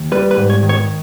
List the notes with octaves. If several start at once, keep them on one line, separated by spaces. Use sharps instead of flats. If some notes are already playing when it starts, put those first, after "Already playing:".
Already playing: D#2
G3 B4
B4
G#2
C#5
D#3
C#5